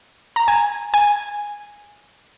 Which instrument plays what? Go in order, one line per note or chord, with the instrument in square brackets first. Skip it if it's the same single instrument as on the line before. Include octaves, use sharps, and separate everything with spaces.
[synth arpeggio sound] A#5
G#5
G#5